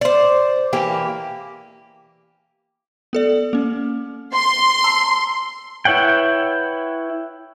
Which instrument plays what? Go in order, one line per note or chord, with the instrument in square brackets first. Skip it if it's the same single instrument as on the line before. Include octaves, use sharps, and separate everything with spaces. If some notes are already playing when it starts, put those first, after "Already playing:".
[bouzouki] C5 D5
E3 A#3 G4
[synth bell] B3 A4 D5
A#3 C#4
[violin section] C6
[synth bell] A5 A#5 E6
[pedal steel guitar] E4 B4 C#5 F#5 G5